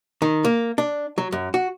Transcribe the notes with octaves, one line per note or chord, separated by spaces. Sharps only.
D#3
A#3
D4
F#3
F#2
F#4